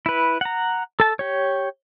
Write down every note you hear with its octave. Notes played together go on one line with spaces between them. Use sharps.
E4 B4
F#5 A#5
A4 A5
G4 C#5